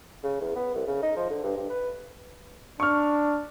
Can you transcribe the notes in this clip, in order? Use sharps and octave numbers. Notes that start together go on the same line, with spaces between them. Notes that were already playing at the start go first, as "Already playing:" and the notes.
C#3
E2
B3
C2
C#3
D#4
F3
D3
G2
G2
B4
D4 C#6 F6